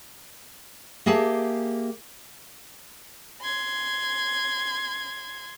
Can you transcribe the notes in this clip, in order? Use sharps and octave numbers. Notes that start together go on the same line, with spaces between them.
A#3 G4 G#4 E5 A5
C6 G#6